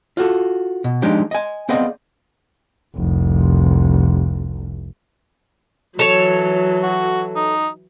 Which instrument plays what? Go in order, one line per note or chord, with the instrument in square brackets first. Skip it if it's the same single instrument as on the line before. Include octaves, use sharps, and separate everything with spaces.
[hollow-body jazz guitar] F4 F#4 A4
B2
F3 G#3 D4 D#4 G4
D#5 G#5
B3 C4 G#4 D5 D#5 F5
[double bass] F1 C2
[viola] E3 F#3 [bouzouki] A4 C#5
[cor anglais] F#4
D#4